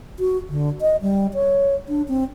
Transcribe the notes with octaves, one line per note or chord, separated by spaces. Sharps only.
F#4
D3
D#5
G3
C#5
D4
C4